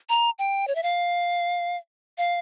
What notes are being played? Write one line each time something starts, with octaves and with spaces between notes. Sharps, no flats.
A#5
G5
C#5
E5
F5
F5